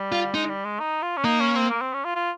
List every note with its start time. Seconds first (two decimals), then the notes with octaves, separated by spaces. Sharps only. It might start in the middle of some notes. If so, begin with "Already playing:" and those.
Already playing: G3
0.12 F4
0.34 G#3 D#4
0.49 G3
0.65 G#3
0.80 D#4
1.02 F4
1.17 C#4
1.24 A#3 D#4
1.40 C#4
1.55 C4
1.70 A#3
1.81 C4
1.93 C#4
2.05 F4
2.15 F4